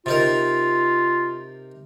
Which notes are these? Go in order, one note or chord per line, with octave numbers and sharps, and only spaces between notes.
C3 D#4 F4 A#4